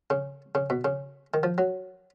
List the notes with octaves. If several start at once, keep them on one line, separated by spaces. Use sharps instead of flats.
C#3
C#3
B2
C#3
D#3
F3
F#3